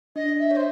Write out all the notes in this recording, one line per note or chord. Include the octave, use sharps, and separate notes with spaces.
D4 D#5
E5
C5 C#5